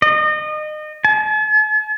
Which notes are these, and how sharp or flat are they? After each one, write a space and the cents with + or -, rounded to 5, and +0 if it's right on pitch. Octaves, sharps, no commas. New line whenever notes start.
D#5 -30
A5 -45